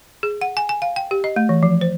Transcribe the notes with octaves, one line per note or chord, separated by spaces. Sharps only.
G#4
F#5
G#5
G#5
F5
G5
G4
D#5
A3
E3
F3
C5